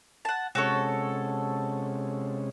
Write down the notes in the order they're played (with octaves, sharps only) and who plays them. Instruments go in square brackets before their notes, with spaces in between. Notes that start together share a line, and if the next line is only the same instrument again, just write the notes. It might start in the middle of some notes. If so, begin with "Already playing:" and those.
[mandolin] F#5 A5
[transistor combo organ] C3 G#3 C#4 [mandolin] F#4 A4 C#5